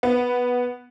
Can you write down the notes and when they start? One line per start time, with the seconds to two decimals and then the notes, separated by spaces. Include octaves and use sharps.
0.03 B3